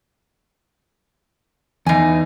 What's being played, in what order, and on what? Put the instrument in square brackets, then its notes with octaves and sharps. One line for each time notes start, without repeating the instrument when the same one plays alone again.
[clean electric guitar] E2 D#4 [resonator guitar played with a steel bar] E3 G#5